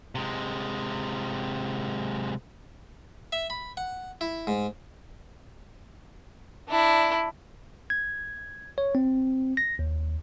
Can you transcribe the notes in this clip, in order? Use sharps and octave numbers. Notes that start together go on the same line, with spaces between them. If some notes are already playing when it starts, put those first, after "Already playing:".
C3 G#3
E5
B5
F#5
E4
G#2
D4 E4
G#6
C#5
C4
A#6
D#2